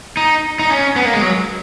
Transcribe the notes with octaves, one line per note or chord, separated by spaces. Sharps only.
D#4
D#4
C#4
B3
A#3
G#3
F#3